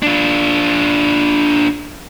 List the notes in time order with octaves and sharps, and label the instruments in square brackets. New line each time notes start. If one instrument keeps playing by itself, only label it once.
[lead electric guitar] D4 F4